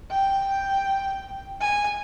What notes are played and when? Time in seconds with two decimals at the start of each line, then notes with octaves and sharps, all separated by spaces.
0.11 G5
1.61 G#5